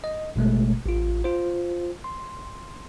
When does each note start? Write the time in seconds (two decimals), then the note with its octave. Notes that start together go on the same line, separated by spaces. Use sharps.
0.04 D#5
0.36 G#1 B2 G#3 A3
0.86 A1 F4
1.24 F4 C5
2.04 C6